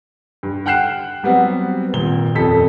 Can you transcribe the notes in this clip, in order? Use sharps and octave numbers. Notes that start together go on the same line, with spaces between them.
G2
F#5 G5 F6 F#6 C7 E7
F#3 G3 B3 C4
G#1 A#2 G7
D#1 F2 A4 B6